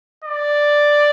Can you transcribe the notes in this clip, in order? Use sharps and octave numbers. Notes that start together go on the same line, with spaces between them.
D5